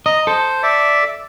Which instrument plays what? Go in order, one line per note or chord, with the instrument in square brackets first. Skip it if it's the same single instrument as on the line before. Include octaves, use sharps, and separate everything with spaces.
[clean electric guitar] D#5 [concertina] A#5
[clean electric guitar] A4 [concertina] C5
[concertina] D5 E5